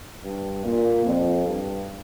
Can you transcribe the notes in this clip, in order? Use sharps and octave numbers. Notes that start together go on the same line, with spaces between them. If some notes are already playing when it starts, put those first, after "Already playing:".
G2
A#2
F2
G2